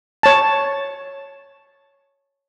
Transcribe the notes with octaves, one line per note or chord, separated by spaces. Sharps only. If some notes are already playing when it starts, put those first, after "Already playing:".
C#5 A5